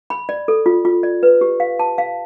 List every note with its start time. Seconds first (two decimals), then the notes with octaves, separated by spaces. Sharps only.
0.10 B5
0.29 D5
0.48 A4
0.66 F4
0.85 F4
1.03 D5
1.23 B4
1.41 G4
1.60 F5
1.79 A5
1.98 F5